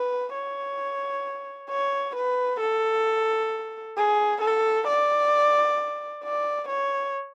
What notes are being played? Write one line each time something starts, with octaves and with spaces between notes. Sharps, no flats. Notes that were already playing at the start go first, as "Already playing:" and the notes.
Already playing: B4
C#5
C#5
B4
A4
G#4
A4
D5
D5
C#5